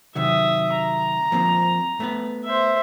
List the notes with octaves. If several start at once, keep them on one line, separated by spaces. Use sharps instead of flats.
C3 D#3 F#3 E5 D#6
A#5
F3 A#3 C4
A3 B3 B4
C5 E5